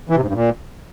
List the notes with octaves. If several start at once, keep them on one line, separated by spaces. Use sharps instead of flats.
E3
C3
G#2
G2
A#2